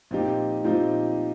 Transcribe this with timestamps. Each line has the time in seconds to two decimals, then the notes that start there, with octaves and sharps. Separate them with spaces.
0.11 A#2 F3 C4 D#4 G4
0.64 A#2 F3 C4 D#4 G4